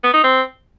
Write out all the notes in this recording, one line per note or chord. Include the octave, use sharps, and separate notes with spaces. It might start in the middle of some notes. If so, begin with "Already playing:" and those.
B3
D#4
C4